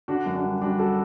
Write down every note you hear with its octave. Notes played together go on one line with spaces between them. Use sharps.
D3 D4 F#4
F#2
D4 F#4
G3
G3 D4 F#4
G3 F#4 A4